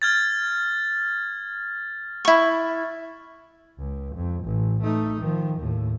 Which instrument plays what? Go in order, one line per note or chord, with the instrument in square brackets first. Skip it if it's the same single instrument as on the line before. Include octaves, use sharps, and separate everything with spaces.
[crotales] F6 G#6 A6
[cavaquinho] E4 C#6
[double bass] C#2
F2
A1
A3 D#4
D#3 F3
D#2 A2